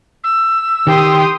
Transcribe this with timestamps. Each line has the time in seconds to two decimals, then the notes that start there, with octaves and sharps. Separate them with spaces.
0.23 E6
0.87 D#3 G4 G5 C6 D#6